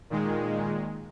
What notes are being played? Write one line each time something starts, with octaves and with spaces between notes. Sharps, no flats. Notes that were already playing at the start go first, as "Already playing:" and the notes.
A#2 D#3 G#3